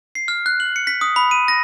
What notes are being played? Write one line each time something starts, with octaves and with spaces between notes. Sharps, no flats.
C7
F6
F#6
F#7
C#7
B6
D#6
B5
D#7
A#6